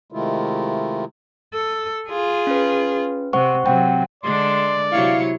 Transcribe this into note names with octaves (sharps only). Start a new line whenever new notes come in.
C3 D#3 G#3 A3 E4 F4
A4
F4 G#4
C#4 B4
C3 C5 F#5 C#6
C3 F#3 C4 F#5 G5
D3 G#3 D4 D5 C6
C3 F#3 E4 C#5 F5